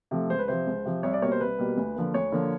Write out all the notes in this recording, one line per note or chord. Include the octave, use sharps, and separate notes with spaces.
C3 F3 A3
C#2 C5
B4
C3 F3 C5
C#2
C3 F3
C2 C#5
D5
B2 G3 A#3 C#5
C5
C2 B4
B2 G3 A#3
D2
D3 F3 A#3
D2 C#5
D3 F3 A#3